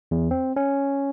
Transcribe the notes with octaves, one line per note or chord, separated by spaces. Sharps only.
E2
C4
C#4